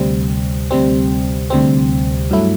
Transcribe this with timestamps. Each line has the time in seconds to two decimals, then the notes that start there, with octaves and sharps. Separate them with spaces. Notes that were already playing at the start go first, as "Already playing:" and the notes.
Already playing: D2 C3 G3 C4
0.71 D2 C3 G3 C4
1.50 D2 C3 G3 C4
2.31 G2 F#3 A3 E4